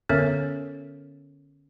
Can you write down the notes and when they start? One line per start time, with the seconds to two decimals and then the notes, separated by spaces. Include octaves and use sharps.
0.09 D3 B3 C#4 A#4 C#5 E5